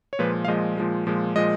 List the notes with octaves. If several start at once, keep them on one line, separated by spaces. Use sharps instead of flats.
C#5
A#2 F3 G#3 B4
F5
A#2 F3 G#3 D#5
A#2 F3 G#3
A#2 F3 G#3
A#2 F3 G#3 D#5